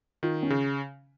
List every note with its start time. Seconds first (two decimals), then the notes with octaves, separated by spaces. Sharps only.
0.23 D#3 F4
0.43 C#4
0.50 C#3